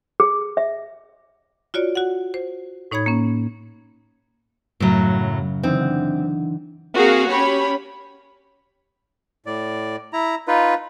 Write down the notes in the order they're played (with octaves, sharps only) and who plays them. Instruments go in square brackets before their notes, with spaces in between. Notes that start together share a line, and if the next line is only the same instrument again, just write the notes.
[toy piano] G#4
E5
[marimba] F4 F#4 C#5 D5
F#4 F#5
C5
A2 D#4 C#5 B5 G#6
A#3 C#4
[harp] F#2 C#3 [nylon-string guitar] A2 F#3
[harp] D3 E3 D#4 [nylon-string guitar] C4
[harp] F#5
[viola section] A#3 C4 F#4 G#4 A#4 F5
C#4 G4 C#5 B5
[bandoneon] A2 D5
E4 A#5
D#4 F4 B4